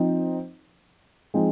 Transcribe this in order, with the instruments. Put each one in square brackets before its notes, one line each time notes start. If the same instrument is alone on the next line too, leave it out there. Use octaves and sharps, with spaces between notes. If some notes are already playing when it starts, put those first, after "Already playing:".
Already playing: [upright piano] F3 C4 D#4
F3 G#3 C4 D#4